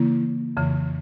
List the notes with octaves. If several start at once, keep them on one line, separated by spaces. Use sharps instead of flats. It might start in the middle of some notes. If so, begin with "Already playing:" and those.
Already playing: C#3 E3 A#3 E4
F2 C#3 E3